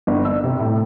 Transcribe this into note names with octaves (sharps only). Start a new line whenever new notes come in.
G1
E6
C3
A2